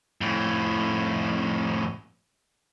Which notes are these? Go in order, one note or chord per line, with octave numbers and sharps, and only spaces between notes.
F2 A2